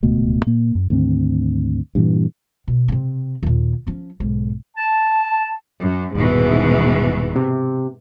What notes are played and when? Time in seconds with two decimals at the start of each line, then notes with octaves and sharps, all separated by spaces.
0.03 D1 C#2 B2 A3
0.47 A#2 A#3
0.75 F#2
0.90 D2 G#2 D#3 C4
1.95 G2 A#2 E3
2.68 B2
2.88 C3 C4
3.43 D#2 A#2
3.87 F3 C#4
4.20 B1 G#2
4.77 A5
5.82 F#2
6.15 D#1 G#2 B2 E3
7.36 C3